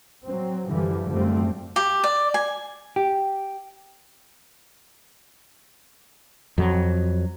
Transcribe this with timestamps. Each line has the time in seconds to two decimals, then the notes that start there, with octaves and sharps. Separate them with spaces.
0.24 F#3 C4
0.67 F#2 D3 E3 F3 G3
1.09 F#2 D3 F3 G3 A3 C4
1.76 G4
2.04 D5
2.34 G#5
2.96 G4
6.58 F2 F#3